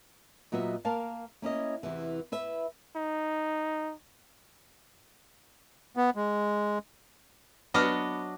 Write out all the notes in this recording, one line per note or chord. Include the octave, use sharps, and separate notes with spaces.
A#2 F#3 B3 D#5 E5
A#3 A#4 F5 A5
A#3 C#4 E4 D#5
E2 C3 E3
E4 B4 E5
D#4
B3
G#3
F#3 B3 D4 D#5 D6 F6